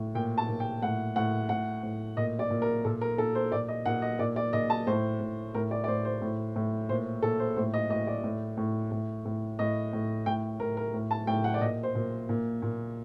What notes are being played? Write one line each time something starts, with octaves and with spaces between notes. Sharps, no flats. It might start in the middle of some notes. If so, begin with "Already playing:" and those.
Already playing: A2
A#2 G5
A5
A#2
G5
A2 F#5
A2 F#5
A2 F#5
A2
A#2 D#5
D5
A#2
A#4
A#2 A4
A#4
A#2 A4
C5
A#2 D5
D#5
A#2 F#5
D#5
A#2 D5
D5
A#2 D#5
A5
A2 C5
A2
A2 A#4
D5
D5
A2 C5
C5
A2
A2
A#2 C5
A#2 A4
C5
A2 C5
D#5
A2 D#5
D5
A2
A2
A2
A2
A2 D#5
A2
A2 G5
A2 A#4
A#4
A2
A5
A2 G5
F#5
D5
A#2 D#5
C5
A#2
A#2
A#2